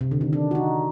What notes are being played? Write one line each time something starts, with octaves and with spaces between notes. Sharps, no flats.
C3
D3
D#3
D4
F#4
D#4